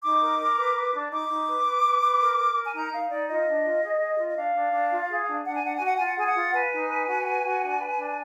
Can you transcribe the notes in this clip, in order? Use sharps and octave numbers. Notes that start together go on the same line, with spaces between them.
D#4 D6
A#4
A#4
B4
B4
D4
D#4 D6
D#4
B4
B4
B4
B4
A#4
A#4
A#4
G#5
D#4 A#5
D#4 F5
D#4 D5
F4 D#5
D4
F4
G#4
G#4
F4
D#5
D4 F5
D4
D4
F4
G#4
D4
D4 F#5
G#5
D4 F#5
G#5
F#4 F#5
F4 G#5
F#5
G#4 G#5
F#5
F4
B4 G#5
D#4
B4
F#4
B4
F#4
D4
B4
D4